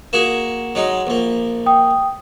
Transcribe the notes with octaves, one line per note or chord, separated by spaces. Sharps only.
A#3 F#4 G#4 E7
F#3 G#3 D#4
A#1 A#3
G5 D#6